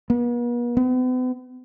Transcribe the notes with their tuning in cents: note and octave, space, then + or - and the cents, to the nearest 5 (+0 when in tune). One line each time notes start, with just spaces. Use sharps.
B3 -45
B3 +45